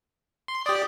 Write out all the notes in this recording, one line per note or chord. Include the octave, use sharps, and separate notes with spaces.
C6
G4 D5 D#6